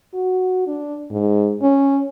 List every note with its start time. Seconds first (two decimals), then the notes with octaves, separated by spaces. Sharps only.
0.14 F#4
0.67 D4
1.10 G#2
1.62 C#4